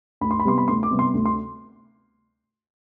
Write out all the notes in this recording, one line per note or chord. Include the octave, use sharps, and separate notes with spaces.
D2 B5
C6
B5
C3 G3 B3 C6
B5
D2 C6
D6
C3 G3 B3
C6
D2
C6